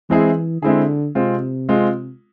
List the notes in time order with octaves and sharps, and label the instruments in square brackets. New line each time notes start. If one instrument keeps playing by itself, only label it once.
[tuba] E3 [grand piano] G#3 C4 E4 G#4
[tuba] D3 [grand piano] G#3 C4 E4 G#4
[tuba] C3 [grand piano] G#3 C4 F4
[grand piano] G#3 C4 F4